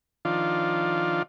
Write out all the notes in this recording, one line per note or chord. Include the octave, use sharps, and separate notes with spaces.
D#3 F3 D4 F4